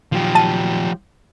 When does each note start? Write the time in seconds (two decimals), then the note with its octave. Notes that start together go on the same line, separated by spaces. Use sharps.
0.12 A#2 D#3 F3 F#3 G4
0.35 A5 A6 D#7